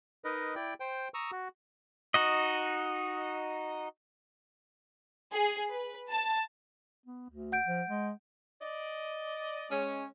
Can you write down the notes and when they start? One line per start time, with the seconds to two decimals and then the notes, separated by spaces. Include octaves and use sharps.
0.24 D#4 A#4 B4 D#5
0.55 E4 D5 G5
0.80 C5 G5
1.14 A#5 C#6 D#6 E6
1.32 F#4
2.14 D#4 F#4 D#5
5.32 G#4
5.72 B4
6.09 A5
7.06 B3
7.30 D2
7.52 F#5 G6 D7
7.66 F3
7.89 G#3
8.62 D5 D#5
9.71 G#3 C#4